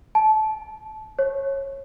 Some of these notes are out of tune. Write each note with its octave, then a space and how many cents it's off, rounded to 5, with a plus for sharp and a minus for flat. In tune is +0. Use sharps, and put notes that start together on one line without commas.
A5 -25
C#5 -20